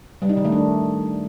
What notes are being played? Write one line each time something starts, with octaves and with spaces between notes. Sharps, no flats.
G3
D#4
D#3
A3
D4